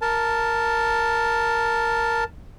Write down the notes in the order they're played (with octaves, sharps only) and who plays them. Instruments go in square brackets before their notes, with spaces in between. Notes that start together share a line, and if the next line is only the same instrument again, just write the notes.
[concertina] A#4 A5